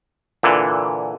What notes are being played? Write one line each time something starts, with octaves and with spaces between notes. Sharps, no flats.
A#2 D3 E3